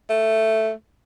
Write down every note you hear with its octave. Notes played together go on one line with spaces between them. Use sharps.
A3